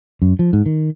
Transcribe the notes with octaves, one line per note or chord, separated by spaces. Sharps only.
F#2
F3
G#2
D#3